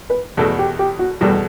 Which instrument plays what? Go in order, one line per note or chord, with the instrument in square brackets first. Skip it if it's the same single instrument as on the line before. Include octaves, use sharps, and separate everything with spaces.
[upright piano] B4
[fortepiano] E2 B2 A3 [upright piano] A4
[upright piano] G4
G4
F#4
[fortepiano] E2 B2 A3 [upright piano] G3